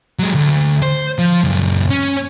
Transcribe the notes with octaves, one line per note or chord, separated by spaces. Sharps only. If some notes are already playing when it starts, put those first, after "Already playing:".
F#3 G#3
D2
C5
F3
C#2 F#2
C#4